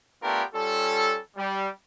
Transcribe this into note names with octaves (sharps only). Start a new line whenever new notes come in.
A3 B3 D4 F4 G4 A#4
G3 C#4 F4 A4
G3